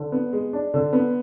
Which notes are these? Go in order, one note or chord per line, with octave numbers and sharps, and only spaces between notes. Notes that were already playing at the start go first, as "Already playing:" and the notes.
Already playing: D3
B3
G#3
D4
D3
B3